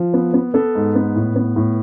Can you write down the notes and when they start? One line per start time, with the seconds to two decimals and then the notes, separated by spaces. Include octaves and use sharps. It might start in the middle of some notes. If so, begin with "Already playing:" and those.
Already playing: F3
0.14 B3
0.34 B3
0.54 B3 A4
0.75 G#2
0.95 B3
1.16 A2
1.36 B3
1.56 A2